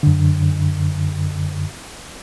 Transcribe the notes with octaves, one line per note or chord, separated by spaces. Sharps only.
F#2 D3